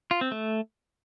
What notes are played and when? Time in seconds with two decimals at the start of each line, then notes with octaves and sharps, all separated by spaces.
0.11 F4
0.21 C4
0.32 A3